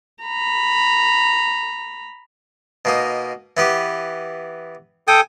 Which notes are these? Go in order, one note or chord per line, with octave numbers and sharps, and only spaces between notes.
A#5 B5
B2 A#3 D#4
E3 B3 G4
A4 G5 G#5 D#6